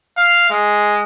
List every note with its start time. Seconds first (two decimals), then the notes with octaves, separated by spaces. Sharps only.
0.18 F5
0.50 G#3